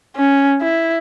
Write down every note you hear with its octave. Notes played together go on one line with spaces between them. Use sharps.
C#4
E4